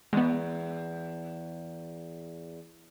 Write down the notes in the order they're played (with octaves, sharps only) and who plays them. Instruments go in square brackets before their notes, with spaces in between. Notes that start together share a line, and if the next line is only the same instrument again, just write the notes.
[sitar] E2 [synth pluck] G#3 B3